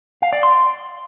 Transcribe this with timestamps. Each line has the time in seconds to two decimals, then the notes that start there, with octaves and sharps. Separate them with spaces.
0.22 F5
0.33 D5
0.43 C6